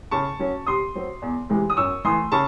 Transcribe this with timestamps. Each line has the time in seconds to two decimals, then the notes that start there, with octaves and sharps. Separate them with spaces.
0.11 C#3 A5 C#6
0.39 F#3 C#4
0.66 C3 C6 D#6
0.95 F#3 C4
1.22 E2
1.50 C3 E3 G#3
1.70 D#6
1.77 F#2 C#6 E6
2.04 E3 A3 C6 D#6
2.32 C#3 A5 C#6